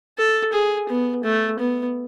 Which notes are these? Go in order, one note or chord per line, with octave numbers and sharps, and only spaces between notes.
A4
G#4
B3
A3
B3